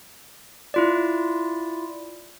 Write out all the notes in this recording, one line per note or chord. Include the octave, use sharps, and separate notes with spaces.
E4 F4 D5